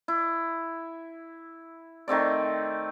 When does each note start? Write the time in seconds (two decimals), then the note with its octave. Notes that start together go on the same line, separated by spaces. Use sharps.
0.08 E4
2.08 D#3 A3 C4 D5